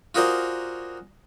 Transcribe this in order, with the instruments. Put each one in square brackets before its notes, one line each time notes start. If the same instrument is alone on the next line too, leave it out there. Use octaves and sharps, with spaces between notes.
[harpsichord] F4 F#4 G#4 A#4 C5 D5